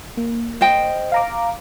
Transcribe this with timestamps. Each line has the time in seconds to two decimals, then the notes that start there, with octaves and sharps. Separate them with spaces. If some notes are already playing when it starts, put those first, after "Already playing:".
0.17 A#3
0.61 C5 D#5 G5
1.12 F5 A#5 D6